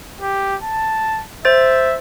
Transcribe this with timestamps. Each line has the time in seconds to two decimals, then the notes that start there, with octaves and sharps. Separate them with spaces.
0.21 G4
0.62 A5
1.45 C5 E5 A6